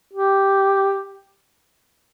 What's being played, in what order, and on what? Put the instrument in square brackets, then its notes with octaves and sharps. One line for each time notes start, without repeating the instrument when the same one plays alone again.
[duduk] G4